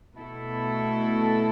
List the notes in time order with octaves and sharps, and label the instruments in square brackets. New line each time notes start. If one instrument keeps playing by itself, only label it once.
[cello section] B2 A3 E4 A4